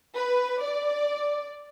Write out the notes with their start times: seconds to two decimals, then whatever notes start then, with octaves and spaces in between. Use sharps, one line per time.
0.17 B4
0.62 D5